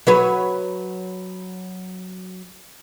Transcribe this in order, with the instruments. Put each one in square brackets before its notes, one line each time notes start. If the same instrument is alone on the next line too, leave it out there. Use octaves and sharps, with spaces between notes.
[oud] F#3 B4 C#5